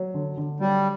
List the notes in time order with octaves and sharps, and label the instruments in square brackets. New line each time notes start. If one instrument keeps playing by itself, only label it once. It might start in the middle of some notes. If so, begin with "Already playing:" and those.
Already playing: [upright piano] F#3
D3
D3
[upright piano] F#3 [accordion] G3